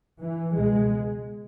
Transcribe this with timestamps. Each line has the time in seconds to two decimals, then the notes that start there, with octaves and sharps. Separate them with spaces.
0.21 E3
0.55 C#2 B2 G#3